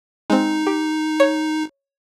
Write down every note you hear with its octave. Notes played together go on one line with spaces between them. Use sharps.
G#3 C4 D#4
G4
C#5